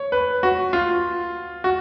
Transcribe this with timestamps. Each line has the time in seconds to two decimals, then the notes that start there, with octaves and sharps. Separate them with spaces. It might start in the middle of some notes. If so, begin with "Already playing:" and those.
Already playing: C#5
0.12 B4
0.43 F#4
0.73 F4
1.64 F#4